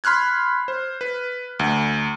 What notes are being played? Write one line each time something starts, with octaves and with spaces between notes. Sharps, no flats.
B5 C6 F6 F#6 G#6
C5
B4
D2